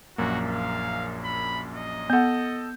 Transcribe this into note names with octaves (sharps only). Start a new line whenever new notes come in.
A#1 F#2 A#3 F#4
F5
B5
D#5
B3 A4 F#5 G6